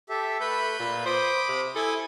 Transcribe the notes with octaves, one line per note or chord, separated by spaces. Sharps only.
G4 A4 E5
A3 B4 B5 G6
A#2
C5 B5 D6 D#6
C3
E4 A4 G#5 D#6